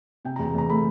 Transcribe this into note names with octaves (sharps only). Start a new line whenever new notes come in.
C3 G5
A#5
E2
E2 A#5
A3 B5